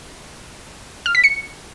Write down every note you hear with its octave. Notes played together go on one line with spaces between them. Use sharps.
F6
B6
C#7